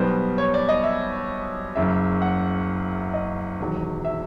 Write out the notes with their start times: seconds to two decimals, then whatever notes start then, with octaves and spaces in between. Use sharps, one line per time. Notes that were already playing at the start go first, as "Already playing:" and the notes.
Already playing: B1 B2 G3 B3 C5
0.38 C#5
0.54 D5
0.69 D#5
0.84 E5
1.75 F#1 F#2 C#3 E5
2.22 F#5
3.14 D#5
3.60 E1 D#2 D#3 F#3
4.05 E5